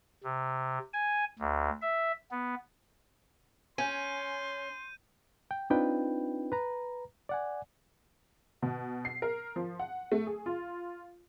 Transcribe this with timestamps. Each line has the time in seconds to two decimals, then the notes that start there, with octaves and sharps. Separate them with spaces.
0.24 C3
0.93 G#5
1.39 D2
1.82 E5
2.31 B3
3.78 C#4 G#5 C6 G6 D#7
5.51 G5
5.70 C4 D4 D#4 F4 B4 G5
6.52 B4 A#5
7.29 D5 F#5 G#5
8.62 B2
9.05 C7
9.22 A#4
9.56 F3
9.79 F#5
10.12 A3
10.27 G#4
10.46 F4